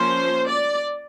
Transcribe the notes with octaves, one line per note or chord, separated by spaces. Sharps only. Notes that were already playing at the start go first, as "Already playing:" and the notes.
Already playing: F3 A#3 C#4 C5
D5